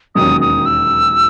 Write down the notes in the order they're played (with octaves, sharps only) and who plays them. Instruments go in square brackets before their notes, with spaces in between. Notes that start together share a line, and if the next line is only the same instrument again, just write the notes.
[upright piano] E1 D#2 D#3 F#3 C#4 [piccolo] D#6
[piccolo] D#6
E6